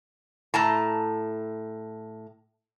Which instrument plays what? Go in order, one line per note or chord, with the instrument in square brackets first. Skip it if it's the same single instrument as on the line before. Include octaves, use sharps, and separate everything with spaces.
[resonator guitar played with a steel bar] A2 A5 A#5